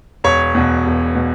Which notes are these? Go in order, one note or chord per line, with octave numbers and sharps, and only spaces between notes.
E1 C#5
E2 B2
E1
B2